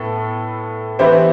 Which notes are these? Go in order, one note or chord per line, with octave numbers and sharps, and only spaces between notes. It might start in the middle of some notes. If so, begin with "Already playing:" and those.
Already playing: A2 B3 A4
E3 B3 E4 G4 C5